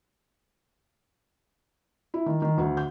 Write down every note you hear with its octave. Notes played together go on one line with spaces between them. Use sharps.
E4
D#3
D#3
D2
G6